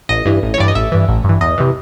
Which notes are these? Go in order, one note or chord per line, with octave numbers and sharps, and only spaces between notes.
A1 D#5
G2 E3
A1
C#5
G2 E3 D5
D#5
A1 E5
G2 E3
A1
G2 E3
E2 D#5
C3 E3